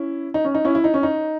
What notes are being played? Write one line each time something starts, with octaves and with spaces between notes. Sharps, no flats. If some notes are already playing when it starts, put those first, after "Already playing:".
Already playing: C#4 E4
D#4
C#4
D#4
C#4 E4
E4
D#4
C#4
D#4